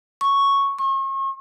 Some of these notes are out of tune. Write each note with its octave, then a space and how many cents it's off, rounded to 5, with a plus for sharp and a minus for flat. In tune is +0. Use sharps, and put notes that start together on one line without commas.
C#6 +0
C#6 -40